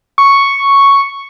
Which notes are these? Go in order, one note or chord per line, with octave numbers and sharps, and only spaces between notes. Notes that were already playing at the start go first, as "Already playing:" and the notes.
C#6